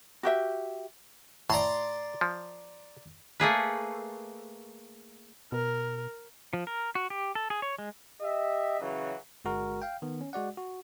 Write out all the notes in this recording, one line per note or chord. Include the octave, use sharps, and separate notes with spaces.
F#4 G4 E5
A2 D5 A#5 C6
F3
A3 A#3 G#4 B4
B2 A#4
F3
A#4
F#4
G4
A4
G#4
C#5
G#3
G4 D#5 E5
C#3 E3 F#3
G1 G#3 F#4 A#4
F5 G5
D#3 B3
C#4
G#3 F#4 D5 F#5
F#4